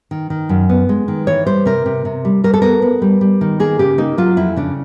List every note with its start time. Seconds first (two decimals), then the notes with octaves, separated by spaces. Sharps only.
0.11 D#3
0.30 D#3
0.49 F#2
0.69 B3
0.89 G#3
1.08 D#3
1.27 E3 C#5
1.46 G3 C5
1.66 C3 A#4
1.86 C3
2.05 C3
2.25 G3
2.44 G3 A#4
2.54 A4
2.62 B3 A#4
2.82 B3
3.02 G3
3.21 G3
3.41 D#3
3.60 A#3 G#4
3.79 C#3 G4
3.98 A#3 D#4
4.18 F#3 F4
4.37 F2 E4
4.56 C#3 D4